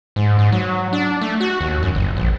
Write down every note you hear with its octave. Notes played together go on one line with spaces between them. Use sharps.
G#2
G#2
F#3
D4
A3
F#4
D#2
F#2
G1
A#1